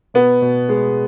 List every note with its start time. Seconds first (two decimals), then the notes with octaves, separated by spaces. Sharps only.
0.14 B2 B3
0.42 B2
0.69 G#3